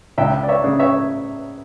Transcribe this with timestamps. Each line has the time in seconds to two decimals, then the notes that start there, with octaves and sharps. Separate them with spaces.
0.18 C#2 E5 G5
0.43 D5
0.49 C#5 E5
0.64 C#3
0.79 C#5 E5